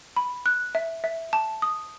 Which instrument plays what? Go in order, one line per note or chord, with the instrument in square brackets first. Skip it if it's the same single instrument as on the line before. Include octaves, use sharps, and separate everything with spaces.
[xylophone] B5
F#6
E5
E5
A5
D#6